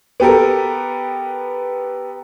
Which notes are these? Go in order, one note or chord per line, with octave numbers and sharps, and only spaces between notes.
B3 G4 A4 A#4